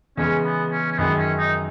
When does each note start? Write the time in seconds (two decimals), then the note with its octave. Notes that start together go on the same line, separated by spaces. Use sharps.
0.17 E2 C#3 G#3 C#4
0.45 B3
0.72 C#4
0.91 C#4
0.98 F#2 D#3 G#3 B3
1.18 C#4
1.38 D#4